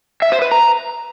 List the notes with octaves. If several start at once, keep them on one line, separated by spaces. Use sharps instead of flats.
E5
C5
B4
A#5